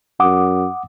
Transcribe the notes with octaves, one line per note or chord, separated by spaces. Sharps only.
F#2 F#5 D6 D#6